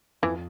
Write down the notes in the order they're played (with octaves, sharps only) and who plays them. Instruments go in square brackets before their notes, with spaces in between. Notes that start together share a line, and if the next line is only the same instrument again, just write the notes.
[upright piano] F2 [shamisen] E3